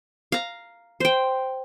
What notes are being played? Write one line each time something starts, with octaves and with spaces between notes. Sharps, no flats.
F5 A#5
C5 G5